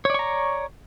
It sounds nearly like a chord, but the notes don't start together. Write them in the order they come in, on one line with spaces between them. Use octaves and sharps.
C#5 D5 C#6 A#5